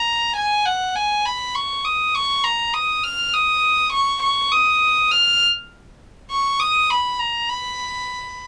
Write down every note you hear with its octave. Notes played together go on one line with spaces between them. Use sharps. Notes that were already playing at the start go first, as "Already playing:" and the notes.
Already playing: A#5
G#5
F#5
G#5
B5
C#6
D#6
C#6
A#5
D#6
F6
D#6
C#6
C#6
D#6
F6
C#6
D#6
B5
A#5
B5